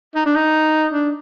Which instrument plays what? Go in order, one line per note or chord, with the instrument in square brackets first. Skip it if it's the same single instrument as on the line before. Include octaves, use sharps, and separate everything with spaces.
[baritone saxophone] D#4
D4
D#4
D4